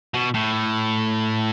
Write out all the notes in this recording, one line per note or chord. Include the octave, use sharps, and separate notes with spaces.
B2
A2